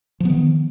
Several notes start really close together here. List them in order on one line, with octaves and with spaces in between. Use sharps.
F3 B3 D#3